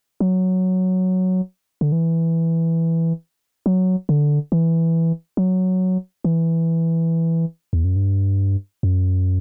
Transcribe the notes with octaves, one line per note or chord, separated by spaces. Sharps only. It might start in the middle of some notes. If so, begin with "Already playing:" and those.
F#3
D3
E3
F#3
D3
E3
F#3
E3
E2
F#2
G2
F#2